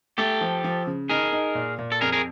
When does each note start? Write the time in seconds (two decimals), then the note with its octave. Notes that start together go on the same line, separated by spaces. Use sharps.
0.18 A3 G4 A4
0.41 F3
0.64 F3
0.87 C#3
1.09 D#4 G#4 A#4
1.32 D#4
1.55 A#2
1.79 A#2
1.92 A4
2.01 F2 G#4 A#4
2.12 G#4 A#4